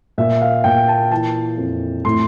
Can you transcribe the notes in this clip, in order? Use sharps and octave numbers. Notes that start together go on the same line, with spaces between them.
A#2 E5
F5
A#2 G5
A5
E3 A5
F2
A2 C6